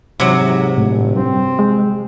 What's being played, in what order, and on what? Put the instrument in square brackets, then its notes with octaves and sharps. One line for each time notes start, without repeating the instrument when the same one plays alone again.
[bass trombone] G#2 [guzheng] C3 F#3
[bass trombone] G1 [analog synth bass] A2
[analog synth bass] G2 [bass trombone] C4
[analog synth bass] G#3